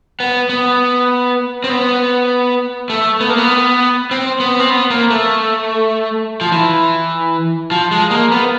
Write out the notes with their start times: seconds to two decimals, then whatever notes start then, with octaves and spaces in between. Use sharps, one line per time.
0.20 B3
0.49 B3
1.64 C4
1.70 B3
2.90 A3
3.20 B3
3.30 A#3
3.38 B3
4.11 C4
4.40 B3
4.60 C4
4.70 B3
4.90 A#3
5.10 A3
6.41 F3
6.52 E3
7.71 F3
7.91 G#3
8.11 A#3
8.32 B3